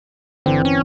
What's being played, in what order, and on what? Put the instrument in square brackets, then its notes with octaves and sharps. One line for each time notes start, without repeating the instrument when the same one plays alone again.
[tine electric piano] G1 E3 C4 [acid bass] D3
[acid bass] C#4